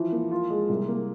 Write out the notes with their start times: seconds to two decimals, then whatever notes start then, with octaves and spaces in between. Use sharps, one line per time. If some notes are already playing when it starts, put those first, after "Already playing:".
Already playing: E3 F3
0.12 A#3
0.31 F4
0.50 G#3
0.69 C2
0.88 A#3